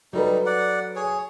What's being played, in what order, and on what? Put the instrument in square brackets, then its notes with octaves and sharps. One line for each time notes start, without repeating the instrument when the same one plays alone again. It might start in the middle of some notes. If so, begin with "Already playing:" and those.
[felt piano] F#3 A4 B4 [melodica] G3 D#4
[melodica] D5 F#5
G#4 C#5